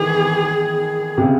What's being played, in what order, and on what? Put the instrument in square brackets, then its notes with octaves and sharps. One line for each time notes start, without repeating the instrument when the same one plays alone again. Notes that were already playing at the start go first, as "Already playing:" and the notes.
Already playing: [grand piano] D#3 E3 [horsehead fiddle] G#4
[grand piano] C3
C#3